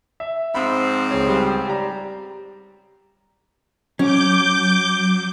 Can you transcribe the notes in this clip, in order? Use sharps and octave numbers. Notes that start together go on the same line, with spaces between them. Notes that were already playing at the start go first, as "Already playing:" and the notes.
E5
G#2 F3 C4 B5
C#2 G#4 C#5
G3
G4 D5 A#5
F#3 C#4 D6 G6